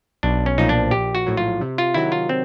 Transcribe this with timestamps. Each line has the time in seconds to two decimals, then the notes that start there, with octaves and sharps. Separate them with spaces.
0.23 B1 D4
0.46 C#4
0.58 A#2 F3 D#4
0.69 D4
0.91 A#1 G4
1.15 F#4
1.26 A2 F#3
1.37 F4
1.61 C3
1.78 F4
1.94 D#3 F#3 E4
2.12 F4
2.29 C4